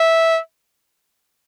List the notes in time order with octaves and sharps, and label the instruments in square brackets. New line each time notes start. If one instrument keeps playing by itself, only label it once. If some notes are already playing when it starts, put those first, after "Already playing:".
Already playing: [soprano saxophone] E5